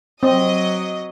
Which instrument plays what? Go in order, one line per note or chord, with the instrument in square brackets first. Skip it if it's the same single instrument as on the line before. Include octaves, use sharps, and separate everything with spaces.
[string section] F#3 D#5 [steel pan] C4